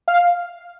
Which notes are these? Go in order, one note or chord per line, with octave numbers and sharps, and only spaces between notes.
F5